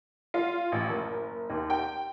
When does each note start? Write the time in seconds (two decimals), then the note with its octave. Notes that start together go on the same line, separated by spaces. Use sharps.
0.34 F4
0.72 A1
0.89 F#1
1.50 D#2
1.70 G5